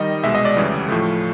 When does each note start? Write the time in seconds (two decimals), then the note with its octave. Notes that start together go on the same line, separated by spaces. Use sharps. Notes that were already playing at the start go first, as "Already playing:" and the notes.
Already playing: D#3 G3 D#5
0.23 C2 B2 G#3 E5
0.35 D#5
0.45 D5
0.56 D2 C#3 E3 G3
0.89 A2 F3 A3